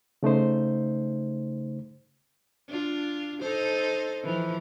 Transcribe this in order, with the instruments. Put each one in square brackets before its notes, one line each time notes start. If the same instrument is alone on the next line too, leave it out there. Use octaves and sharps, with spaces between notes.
[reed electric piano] C#3 A3 D#4 C5
[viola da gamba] D4 F4
D#4 A4 C5
E3 F3